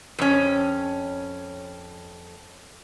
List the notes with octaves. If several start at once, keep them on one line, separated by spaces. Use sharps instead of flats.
F2 C#4